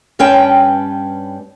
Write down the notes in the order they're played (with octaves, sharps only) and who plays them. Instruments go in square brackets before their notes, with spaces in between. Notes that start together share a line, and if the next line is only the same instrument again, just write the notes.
[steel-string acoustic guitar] G2 G3 C#4 B4 G5 A5